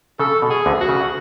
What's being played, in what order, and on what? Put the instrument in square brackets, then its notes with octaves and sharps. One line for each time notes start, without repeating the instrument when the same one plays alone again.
[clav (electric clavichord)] C#3 [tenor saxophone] A4
[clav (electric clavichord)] B2
[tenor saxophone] G#4
[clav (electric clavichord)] D2 D3
[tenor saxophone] F#4
[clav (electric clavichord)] C#3